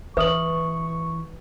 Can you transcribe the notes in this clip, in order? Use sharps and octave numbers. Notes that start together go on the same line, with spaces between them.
E3 B4 E5 C#6 D#6 F#7